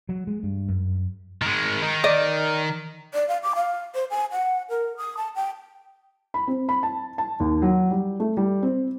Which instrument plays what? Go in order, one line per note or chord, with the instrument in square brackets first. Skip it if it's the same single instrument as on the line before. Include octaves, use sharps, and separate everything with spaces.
[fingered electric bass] F#3
G#3
G2
F#2
[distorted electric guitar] D#3 G#3
D#3
[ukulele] D5 D#5
[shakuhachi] D5
F5
D6
F5
C5
G#5
F#5
A#4
D#6
A5
G5
[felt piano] B5
C4
B5
A5
A5
D#2
F#3
G3
A3
G3
C4